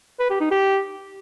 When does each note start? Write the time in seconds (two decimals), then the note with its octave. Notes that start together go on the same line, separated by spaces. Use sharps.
0.19 B4
0.30 G4
0.41 D#4
0.51 G4